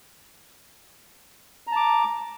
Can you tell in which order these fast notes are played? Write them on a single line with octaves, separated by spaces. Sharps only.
A#5 A5 D6